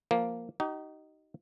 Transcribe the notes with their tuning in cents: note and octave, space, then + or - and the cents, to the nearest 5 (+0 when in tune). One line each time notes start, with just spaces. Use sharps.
F3 +0 A#3 +0
D#4 +0 G4 -45